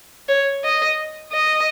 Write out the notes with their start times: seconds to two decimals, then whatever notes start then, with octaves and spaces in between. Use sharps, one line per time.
0.28 C#5
0.64 D#5
1.33 D#5